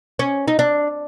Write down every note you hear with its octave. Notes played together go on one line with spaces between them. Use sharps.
C#4
D#4
D4